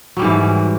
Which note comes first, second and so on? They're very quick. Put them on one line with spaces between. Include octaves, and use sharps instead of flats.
F#3 G3 G#2 E3